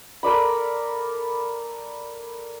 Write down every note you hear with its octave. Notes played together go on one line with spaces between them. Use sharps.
A4 A#4 D5 B5